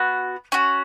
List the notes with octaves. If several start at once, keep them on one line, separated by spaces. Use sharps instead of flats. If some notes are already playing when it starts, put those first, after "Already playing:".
Already playing: B3 F#4
C#4 F#4